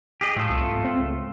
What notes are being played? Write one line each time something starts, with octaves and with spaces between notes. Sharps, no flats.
G4 G#4 D#5
A2 A3 F4 A4
C2
G#1
C4
C#2